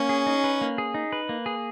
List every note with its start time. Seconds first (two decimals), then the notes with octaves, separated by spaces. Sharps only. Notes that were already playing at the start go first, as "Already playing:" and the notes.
Already playing: A#3 C#4
0.09 G#4
0.26 D#4
0.44 B4
0.61 A#3
0.78 G#4
0.94 D#4
1.12 B4
1.29 A#3
1.46 G#4